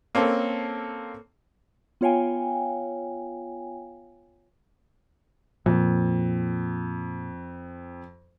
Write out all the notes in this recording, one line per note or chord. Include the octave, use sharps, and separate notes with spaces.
A#3 C4 C#4 A4
B3 F4 C#5 F5 G5 G#5
F2 A#2